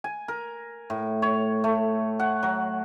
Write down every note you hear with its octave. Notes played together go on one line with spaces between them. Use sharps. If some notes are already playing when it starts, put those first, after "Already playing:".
G#5
A#4
A2
C#5
A3
F#5
F#3